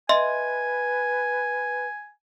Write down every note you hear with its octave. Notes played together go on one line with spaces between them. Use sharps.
B4 D#5 E5 G#5 C6